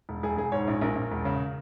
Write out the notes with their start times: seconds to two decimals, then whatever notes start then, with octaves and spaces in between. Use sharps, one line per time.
0.09 E1
0.23 E1 G#4
0.37 E1 G#4
0.52 G#2 C#5
0.68 A#1
0.81 A#1 A#4
0.96 A#1
1.11 E1
1.25 C#3